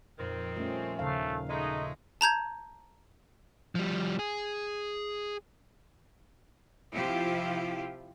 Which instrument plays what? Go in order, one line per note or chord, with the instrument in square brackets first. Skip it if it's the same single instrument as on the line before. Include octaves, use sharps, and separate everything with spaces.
[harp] F2 A#2 [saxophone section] D#3 C4
[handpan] F3 A3 C#4 [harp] G3
[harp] D#2 C#3 [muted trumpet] A3 [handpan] F5
[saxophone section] G#3 A3 [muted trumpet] D#4 [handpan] D#5
[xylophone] A5 A#5 G6 G#6
[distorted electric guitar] F3 G3
G#4
[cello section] C3 F3 E4 F4 G4